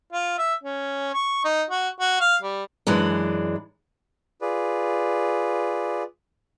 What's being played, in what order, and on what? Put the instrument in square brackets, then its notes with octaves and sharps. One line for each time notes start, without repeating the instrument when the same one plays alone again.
[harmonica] F4
E5
C#4
C#6
D#4
F#4
F#4
F5
G3
[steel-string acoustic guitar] F#2 E3 G#3 D4
[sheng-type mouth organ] F4 G#4 B4 D5